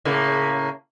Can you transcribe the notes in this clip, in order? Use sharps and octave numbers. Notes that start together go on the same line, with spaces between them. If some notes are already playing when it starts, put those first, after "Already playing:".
A2 C#3 A#3